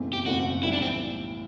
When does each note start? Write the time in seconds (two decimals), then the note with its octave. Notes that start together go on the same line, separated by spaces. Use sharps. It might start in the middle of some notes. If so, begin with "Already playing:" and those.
Already playing: F#1 E2 B2 A3 C4
0.13 G4
0.26 F#1 E2 B2 A3 C4 F#4
0.63 B1 A2 E3 G3 E4
0.73 D4
0.82 C4